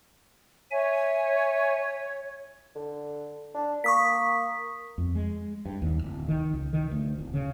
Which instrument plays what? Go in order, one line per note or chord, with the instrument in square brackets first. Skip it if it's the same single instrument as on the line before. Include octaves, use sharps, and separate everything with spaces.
[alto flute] C#5 [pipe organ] E5 G#5
[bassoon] D3
D4
[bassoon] A#3 [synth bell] C#6 D#6 B6
[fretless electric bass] F2
G#3
G2
D#2
D1
D#3
C#2
D#3
D2
D1
C#3